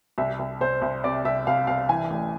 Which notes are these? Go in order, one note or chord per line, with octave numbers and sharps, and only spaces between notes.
C2 E5
C2
C2 C5
C2
C3 D5
C2 E5
C2 F5
C2 F5
E3 G#5
A1